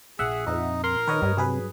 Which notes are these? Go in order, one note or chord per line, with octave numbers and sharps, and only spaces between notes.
A#1 G#4 E5 F#5
F2 D#4
A#4 C6
D#3 B4 C#5 D#5
G2 G3
C3 F#3 G#4 B4